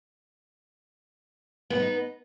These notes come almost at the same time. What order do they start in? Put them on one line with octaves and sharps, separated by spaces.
B3 B4 D#4